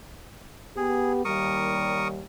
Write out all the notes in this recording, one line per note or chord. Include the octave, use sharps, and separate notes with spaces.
B3 G4 G#4
D#2 G3 A#4 C#6 D#6